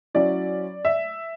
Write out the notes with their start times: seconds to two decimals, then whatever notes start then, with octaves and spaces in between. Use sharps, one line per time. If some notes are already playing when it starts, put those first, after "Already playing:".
0.14 F#3 C#4 E4 D5
0.85 E5